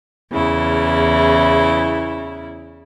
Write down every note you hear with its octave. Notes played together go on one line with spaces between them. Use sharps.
E2 C#3 E4